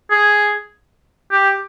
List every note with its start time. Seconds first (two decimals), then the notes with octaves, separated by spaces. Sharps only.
0.11 G#4
1.32 G4